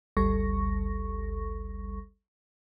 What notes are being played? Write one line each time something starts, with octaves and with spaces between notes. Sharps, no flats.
G#1 D2 G3 A4 C#6 A#6